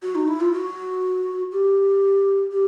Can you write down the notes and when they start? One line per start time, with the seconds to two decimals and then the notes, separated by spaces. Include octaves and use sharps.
0.03 F#4
0.15 D#4
0.28 E4
0.41 F4
0.53 F#4
1.52 G4
2.52 G4